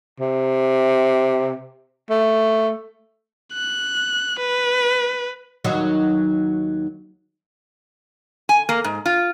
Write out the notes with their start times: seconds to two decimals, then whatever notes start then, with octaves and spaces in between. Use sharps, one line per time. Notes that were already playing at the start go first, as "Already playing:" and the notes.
0.20 C3
2.10 A3
3.53 F#6
4.39 B4
5.65 D#2 F#3 D#4
8.49 G#5
8.69 A#3
8.84 G#2
9.06 F4